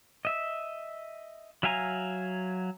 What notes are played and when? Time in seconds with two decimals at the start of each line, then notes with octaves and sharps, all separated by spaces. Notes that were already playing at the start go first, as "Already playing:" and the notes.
0.25 D#5 E5
1.63 F#3 E5 F5 G#5 A#5